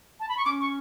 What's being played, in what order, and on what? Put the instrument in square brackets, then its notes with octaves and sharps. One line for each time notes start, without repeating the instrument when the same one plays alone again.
[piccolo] A5
B5
C#6
[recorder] C#4 [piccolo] D6
[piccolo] C#6